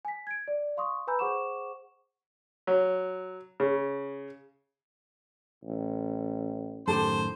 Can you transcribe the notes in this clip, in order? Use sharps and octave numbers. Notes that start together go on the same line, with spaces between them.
G#5 B6
G#6 D7
D5
F5 C6 C#6 D#6
B4 G#5 A#5 B5 E6 G6
G#4 C5 F#5 C#6 D6 E7
F#3
C#3
A1
F#2 A2 D#3 G4 A4 C5